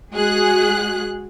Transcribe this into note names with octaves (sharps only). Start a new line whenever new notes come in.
G#3 F#4 G#4 F#6